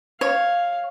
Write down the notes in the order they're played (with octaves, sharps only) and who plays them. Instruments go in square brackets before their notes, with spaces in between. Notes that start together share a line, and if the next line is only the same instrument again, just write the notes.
[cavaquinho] C#5 [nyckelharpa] F5